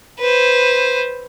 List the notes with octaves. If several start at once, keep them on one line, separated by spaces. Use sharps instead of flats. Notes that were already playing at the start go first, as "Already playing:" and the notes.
B4 C5